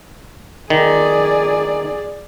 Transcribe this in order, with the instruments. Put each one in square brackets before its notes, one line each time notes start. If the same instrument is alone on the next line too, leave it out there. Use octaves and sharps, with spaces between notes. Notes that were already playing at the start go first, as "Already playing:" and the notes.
[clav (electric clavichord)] D#3 [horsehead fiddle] G#4 D5